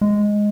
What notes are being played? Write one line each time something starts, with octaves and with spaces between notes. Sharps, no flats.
G#3